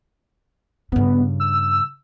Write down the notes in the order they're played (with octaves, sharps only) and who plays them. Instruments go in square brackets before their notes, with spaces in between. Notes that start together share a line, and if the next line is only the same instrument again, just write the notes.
[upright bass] G2 C#3 [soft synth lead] B3
[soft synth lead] E6